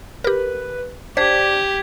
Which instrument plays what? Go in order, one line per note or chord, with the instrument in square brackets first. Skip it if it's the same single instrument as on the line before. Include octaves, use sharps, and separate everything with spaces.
[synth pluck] G4 A#4 [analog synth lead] B4
[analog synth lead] D4 [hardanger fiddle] G4 [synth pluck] C5 [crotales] G#6 B6